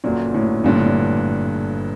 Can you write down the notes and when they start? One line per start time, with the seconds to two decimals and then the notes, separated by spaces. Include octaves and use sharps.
0.04 G1 F#2 A#2 D3 F#3
0.34 A2
0.64 G1 G2 A#2 D3
0.75 A2
0.87 A#2